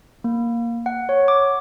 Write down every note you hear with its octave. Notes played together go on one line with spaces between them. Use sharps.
A#3
F#5
C#5
D6